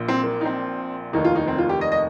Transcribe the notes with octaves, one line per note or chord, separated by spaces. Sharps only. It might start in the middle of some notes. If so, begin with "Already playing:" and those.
Already playing: A#1 A#2
C4
A#3
D#4
C4
F1 D#2 D#3 D#4
F4
D#4
C4
F4
G4
D#5
D#5